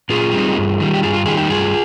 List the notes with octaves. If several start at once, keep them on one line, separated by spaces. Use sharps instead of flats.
A#2 F4 G#4
G3 C4 D#4
G2
D#3 G3
G4
G2 F4 G#4
F4
D#3 G3 F4 G#4
D#4 G4
G2 F4 G#4